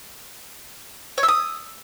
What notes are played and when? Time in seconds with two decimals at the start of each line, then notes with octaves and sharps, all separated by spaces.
1.18 C#5
1.23 E5
1.28 D#6